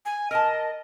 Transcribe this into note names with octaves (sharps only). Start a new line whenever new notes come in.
G#5
A#4 D#5 A5